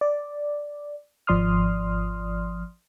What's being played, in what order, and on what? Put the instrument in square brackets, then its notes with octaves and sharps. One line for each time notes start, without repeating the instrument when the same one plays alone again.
[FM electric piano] D5
G#1 F3 D5 C6 D#6 F6